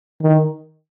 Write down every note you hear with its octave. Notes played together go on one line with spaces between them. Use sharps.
D#3